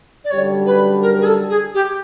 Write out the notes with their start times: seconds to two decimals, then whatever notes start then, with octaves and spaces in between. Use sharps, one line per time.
0.25 D5
0.31 F#2 D3 G3 C#5
0.66 B4
1.02 A#4
1.21 G#4
1.26 A4
1.49 G#4
1.74 G4